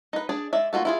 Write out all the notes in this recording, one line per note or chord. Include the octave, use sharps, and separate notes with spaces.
D#4 B4
D4 G#4 D5
G#3 D5 E5
A#3 F4 F#4 A4
E4 F4 G#4